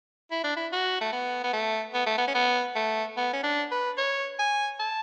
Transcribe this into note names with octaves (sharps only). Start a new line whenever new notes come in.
E4
D4
E4
F#4
A3
B3
B3
A3
B3
A3
B3
C#4
B3
A3
B3
C#4
D4
B4
C#5
G#5
A5